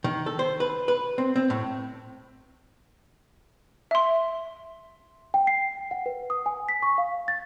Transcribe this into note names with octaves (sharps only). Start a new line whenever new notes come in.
D#3
A4
C5
B4
B4
C4
C4
A2
E5 C6
G5
C7
F#5
B4
D#6
G#5
B6
C#6
F5
A6